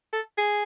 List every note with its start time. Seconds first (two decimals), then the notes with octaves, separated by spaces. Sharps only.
0.13 A4
0.38 G#4